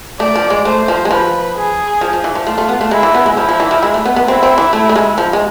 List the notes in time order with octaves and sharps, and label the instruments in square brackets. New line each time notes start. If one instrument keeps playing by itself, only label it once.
[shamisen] A3 [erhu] D5
[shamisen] F3
G#3
[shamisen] A3 [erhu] C5
[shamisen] F3
G#3
[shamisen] F3 [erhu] B4
[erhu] G#4
[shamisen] F3
F3
E3
F3
[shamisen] A3 [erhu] F4
[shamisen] A3
B3
A3
[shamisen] G#3 [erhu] E4
[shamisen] E3
B3
G#3
[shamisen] F3 [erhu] E4
[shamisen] F3
E3
F3
G#3
A3
B3
B3
[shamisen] C4 [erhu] E4
[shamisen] C4
E3
A3
A3
G#3
F3
G#3